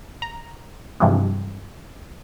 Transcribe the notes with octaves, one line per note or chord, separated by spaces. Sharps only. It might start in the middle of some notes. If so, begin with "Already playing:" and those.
A#5
G2 C3 E3 F3 G3 G#3